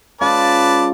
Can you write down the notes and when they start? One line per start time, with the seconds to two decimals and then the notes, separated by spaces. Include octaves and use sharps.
0.21 C#3 G#3 F4 B4 D5 A5